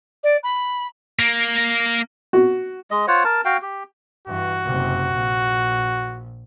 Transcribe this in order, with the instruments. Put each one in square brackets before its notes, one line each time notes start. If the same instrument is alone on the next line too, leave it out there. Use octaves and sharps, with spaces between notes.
[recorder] D5
B5
[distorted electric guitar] A#3
[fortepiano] F#4
[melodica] G#3 D#5
F4 C5 C#5 F#5
A#4 A5
F#4 F5 G5
G4
[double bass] G2 E3 [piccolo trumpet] F#4
[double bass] F#1 C3
A#1